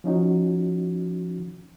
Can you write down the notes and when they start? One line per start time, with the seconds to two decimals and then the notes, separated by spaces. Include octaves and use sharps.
0.04 F3 C#4 D#4 F#4